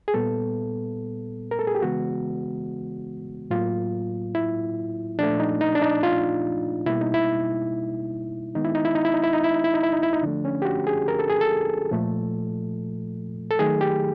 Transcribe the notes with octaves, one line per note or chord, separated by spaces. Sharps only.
G#4
A#2 G3 B3 A4
A#4
A4
G#4
G4
C#3 E3 G#3 B3 F#4
A2 F#3 A#3 F4
E4
A#2 F3 A3 D4
D#4
D#4
D4
D#4
F4
B2 G3 A#3 E4
D#4
E4
D#3 G#3 B3 D#4
E4
D#4
E4
D#4
E4
D#4
E4
D#4
E4
D#4
E4
D#4
E4
D#4
E4
D#4
D3 F3 A3 D4
C#4
G4
F#4
G#4
A#4
A4
G#4
A4
A#2 F3 A3
A4
D#3 F#3 A3 G#4
G4